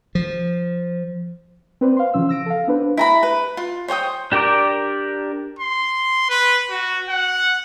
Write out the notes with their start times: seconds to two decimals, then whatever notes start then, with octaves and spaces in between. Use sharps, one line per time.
0.15 F3
1.81 C4 B4 C5 D5
1.97 F5 C6
2.14 C#3 E3 F3 C#4 E6
2.29 E6 A#6 D7
2.46 A4 F5
2.67 B3 D4 B4 C5
2.97 E4 A#5 B5
3.23 B4
3.57 F4
3.88 C5 C#5 G5 D#6
4.32 D4 G4 A#4 D5 D6
5.59 C6
6.29 B4
6.70 F#4
7.09 F#5